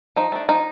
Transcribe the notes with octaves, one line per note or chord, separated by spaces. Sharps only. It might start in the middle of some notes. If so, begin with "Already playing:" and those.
F3 D#4
A3 D4
F3 D#4